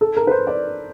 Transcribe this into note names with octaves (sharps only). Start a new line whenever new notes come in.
A4
A#4
B4
C5
D5